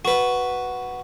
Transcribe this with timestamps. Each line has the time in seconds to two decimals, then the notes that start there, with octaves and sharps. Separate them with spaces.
0.05 F#4 B4